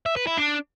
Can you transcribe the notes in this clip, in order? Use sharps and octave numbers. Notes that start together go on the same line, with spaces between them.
E5
B4
E4
D4